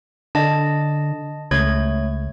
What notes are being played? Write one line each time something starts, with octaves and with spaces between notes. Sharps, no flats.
D3 D#5 A5
C#2 A3 C#5 G#6